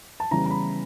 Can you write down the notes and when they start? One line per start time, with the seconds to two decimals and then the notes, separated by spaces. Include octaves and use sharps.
0.20 A5
0.31 C#3 E3 G3 B3 A#5
0.46 A#5
0.50 B5